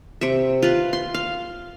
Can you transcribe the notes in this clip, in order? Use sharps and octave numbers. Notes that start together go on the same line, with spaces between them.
C3 E5
F4 B4
C6
F5